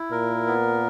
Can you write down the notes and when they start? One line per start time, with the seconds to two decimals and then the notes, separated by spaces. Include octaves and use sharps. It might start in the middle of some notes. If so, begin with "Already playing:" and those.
Already playing: E4
0.12 A#2 A#4
0.47 B3